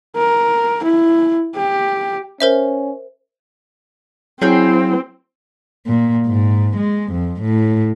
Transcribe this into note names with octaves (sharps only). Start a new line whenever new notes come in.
A#4
E4
G4
C#4 A#4 C5 E5
F#3 C4 E4 G#4 F5 G5
A#2
G#2
G#3
F2
A2